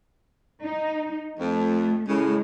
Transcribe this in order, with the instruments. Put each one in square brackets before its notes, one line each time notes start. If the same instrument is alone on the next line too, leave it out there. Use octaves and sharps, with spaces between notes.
[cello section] D#4
[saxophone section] F2 [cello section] A3
[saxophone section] A2 C#3 [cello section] G#3